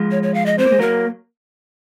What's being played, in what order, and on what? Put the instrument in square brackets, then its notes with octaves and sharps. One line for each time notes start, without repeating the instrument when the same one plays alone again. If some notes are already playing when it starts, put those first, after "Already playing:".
Already playing: [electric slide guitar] F3 G#3
[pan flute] C#5
C#5
F5
D#5
[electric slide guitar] C4 [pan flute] C5
[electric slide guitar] A#3
G#3
[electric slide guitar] F#3 A#3 [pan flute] A#4